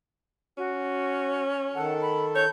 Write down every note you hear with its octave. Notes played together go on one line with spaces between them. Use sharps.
C#4 F#4
D#3 A4 F#5
B5
C#5 G6